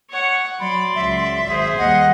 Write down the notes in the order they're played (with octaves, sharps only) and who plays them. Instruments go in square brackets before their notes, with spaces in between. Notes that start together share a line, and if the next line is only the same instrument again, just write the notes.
[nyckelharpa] C#5 F#5
[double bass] F#3 [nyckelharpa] D5 [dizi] B5 [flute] C6
[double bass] C#2 F#3 [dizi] E5
[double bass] G#1 [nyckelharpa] G#4 C5
[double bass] D#2 G3 [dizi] D#5 [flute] F#5